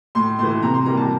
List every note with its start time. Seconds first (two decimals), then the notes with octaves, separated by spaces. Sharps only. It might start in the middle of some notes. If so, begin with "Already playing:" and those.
0.15 A2 C6
0.39 E3 A3 C6
0.62 C3 A#5
0.74 C6
0.86 E3 G3 A#3 A#5
0.97 A5